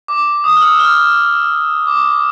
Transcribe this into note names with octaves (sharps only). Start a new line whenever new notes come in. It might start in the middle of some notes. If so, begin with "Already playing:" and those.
D6
D#6
F6
E6
F6
D6